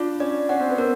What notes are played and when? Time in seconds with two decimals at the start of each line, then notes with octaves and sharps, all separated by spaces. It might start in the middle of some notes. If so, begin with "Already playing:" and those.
Already playing: D4 F4
0.20 C#4 D5
0.49 C#4 F#5
0.60 C4
0.70 B3
0.78 C4 A#4